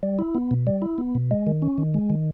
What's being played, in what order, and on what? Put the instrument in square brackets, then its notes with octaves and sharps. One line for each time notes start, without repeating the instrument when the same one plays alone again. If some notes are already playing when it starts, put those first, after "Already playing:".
[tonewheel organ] G3
E4
B3
B2
G3
E4
B3
B2
G#3
D#3
C#4
D#3
G#3
D#3